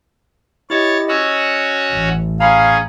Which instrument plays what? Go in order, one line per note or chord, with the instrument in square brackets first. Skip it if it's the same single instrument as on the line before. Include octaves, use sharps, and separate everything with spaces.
[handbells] E4 G4 D#5 [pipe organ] C#5 A6
[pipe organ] C#4 F#4 C#5 [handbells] D#5 E6
[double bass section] A1
[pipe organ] C#4 G#4 [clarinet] F5 [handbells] A#5 B5